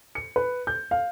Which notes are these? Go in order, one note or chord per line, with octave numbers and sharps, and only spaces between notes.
C#7
B4
G6
F5